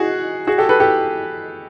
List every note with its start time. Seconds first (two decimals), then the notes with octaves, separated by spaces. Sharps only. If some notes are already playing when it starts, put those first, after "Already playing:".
Already playing: F#4 G#4
0.47 F#4 G#4
0.58 G4 A4
0.69 A4 B4
0.80 G4 A4